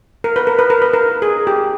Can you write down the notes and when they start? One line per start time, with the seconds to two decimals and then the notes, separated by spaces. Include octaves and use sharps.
0.24 A#4
0.36 B4
0.47 A#4
0.59 B4
0.70 A#4
0.82 B4
0.93 A#4
1.22 G#4
1.47 G4